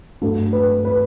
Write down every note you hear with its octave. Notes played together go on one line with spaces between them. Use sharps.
G2 F#3 A3 A4
B4
B4